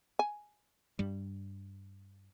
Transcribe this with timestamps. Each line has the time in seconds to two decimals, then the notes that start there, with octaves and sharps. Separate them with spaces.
0.19 G#5
0.99 G2 G3